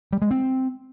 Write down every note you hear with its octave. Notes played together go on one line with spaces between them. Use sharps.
G3
G#3
C4